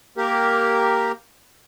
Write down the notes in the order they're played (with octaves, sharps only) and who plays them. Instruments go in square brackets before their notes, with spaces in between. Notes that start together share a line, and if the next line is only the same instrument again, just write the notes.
[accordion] A#3 G4 A#4